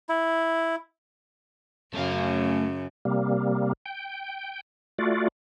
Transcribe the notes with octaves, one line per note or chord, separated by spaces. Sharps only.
E4
F#2 C#3 A3 F5
C3 G3 A#3
G5
A3 F4 F#4 D5